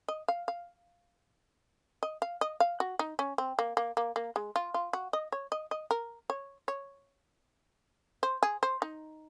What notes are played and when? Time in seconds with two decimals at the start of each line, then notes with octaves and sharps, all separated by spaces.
0.08 D#5
0.28 F5
0.48 F5
2.03 D#5
2.22 F5
2.41 D#5
2.60 F5
2.80 F#4
2.99 D#4
3.19 C#4
3.38 C4
3.59 A#3
3.77 A#3
3.97 A#3
4.16 A#3
4.36 G#3
4.56 F4
4.74 F4
4.93 F#4
5.13 D#5
5.32 C#5
5.52 D#5
5.71 D#5
5.91 A#4
6.30 C#5
6.68 C#5
8.23 C5
8.43 G#4
8.63 C5
8.82 D#4